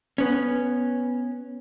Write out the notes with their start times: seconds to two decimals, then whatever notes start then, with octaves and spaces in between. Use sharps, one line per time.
0.18 B3 C#4